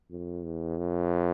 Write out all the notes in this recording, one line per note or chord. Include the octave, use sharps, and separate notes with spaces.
F2
E2
F2